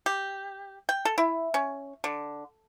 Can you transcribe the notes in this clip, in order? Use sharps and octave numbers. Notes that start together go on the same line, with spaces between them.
G4
G5
A4
E4
C#4
D3